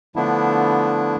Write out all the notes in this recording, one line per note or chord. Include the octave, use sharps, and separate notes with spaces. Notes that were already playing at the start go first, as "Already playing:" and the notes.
D3 F3 A3 B3 D4 E4